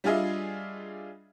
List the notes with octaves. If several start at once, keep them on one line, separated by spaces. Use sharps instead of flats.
G3 D4 F4 G#4 D#5 E5